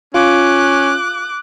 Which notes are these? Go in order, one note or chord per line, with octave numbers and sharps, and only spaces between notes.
C#4 F4 D6 F#6